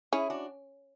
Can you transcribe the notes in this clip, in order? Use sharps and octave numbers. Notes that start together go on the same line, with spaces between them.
C#4 E4 G#4
D4 F#4